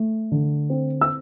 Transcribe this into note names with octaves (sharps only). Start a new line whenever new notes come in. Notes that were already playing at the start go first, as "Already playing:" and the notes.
Already playing: A3
D3
C4
E6